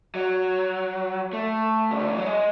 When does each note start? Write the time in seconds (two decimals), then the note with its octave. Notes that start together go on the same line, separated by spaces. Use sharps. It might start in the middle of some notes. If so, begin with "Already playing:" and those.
0.15 F#3
1.33 A3
1.91 C#3
2.00 D3
2.08 E3
2.18 F#3
2.26 G#3